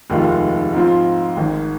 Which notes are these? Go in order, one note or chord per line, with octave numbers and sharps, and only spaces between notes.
F1 D#2 D#3 G#3 F4
G#2 F3 C4 F4
G#1 G#2 D#3